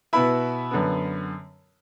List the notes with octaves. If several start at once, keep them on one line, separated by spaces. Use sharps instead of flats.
B2 B3 E4 B5
F#2 D3 B3